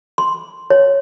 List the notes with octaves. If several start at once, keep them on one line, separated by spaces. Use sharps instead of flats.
C6
C#5